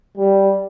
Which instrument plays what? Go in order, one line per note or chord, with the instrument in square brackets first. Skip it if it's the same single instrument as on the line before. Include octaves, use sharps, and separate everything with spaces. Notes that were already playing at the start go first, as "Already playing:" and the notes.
[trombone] G3